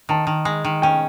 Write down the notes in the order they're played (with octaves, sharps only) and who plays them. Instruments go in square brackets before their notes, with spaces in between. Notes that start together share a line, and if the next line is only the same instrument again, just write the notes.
[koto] D#3 [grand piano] A5
[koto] D#3
G#3
D#3
[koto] C#4 [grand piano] G5